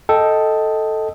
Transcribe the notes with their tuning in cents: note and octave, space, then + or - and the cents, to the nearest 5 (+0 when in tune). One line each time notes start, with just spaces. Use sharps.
A4 +0 D#5 +5 G5 +0